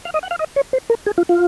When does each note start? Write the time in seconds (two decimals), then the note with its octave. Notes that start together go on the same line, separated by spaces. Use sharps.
0.05 F5
0.14 D#5
0.23 F#5
0.31 F5
0.39 D#5
0.56 C#5
0.73 C5
0.90 A#4
1.06 G#4
1.18 F4
1.29 F4